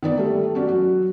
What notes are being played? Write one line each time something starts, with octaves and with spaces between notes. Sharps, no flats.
D#3 B3 D5
G3 A3
C#4 F#4 D5
F#3 F#4